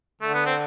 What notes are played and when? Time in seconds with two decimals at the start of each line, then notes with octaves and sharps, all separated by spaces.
0.21 D3 A3
0.33 B3
0.46 C4